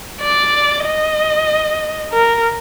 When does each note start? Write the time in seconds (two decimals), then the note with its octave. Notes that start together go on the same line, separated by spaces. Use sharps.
0.21 D5
0.85 D#5
2.13 A#4